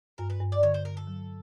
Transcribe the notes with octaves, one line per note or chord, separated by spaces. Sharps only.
G2 A#4
B4
G2
D5
D3 C#5
C5
D3 A#4
A4
F#3